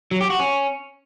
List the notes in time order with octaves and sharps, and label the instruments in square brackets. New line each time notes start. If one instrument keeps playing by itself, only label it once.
[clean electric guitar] F#3
G4
F#4
C#4